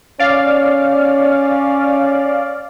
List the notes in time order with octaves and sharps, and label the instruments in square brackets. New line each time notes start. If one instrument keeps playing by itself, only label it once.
[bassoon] C#4 [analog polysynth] D5 F5